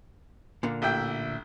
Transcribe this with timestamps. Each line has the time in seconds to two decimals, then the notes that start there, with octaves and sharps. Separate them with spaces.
0.63 A#2 D3 A#3
0.82 A1 E4 G5